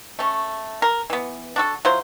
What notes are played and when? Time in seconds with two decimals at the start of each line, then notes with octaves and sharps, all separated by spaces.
0.19 A3 C#4
0.82 A#4
1.10 E3 B3
1.56 D4 F#4 A4
1.85 F#3 E4 F4 C5